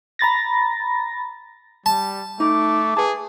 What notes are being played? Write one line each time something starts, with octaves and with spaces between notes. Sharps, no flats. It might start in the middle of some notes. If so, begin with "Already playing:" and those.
A#5 B5 A6 A#6
G3 A5
A3 D#4 D6
G#4 B4 A5